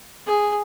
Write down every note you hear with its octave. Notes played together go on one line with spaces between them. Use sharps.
G#4